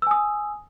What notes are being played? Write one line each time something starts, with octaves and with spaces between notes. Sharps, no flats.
G#5 D#6 E6